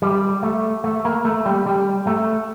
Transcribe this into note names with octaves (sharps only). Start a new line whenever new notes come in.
G3
A3
A3
A#3
A3
G3
G3
A3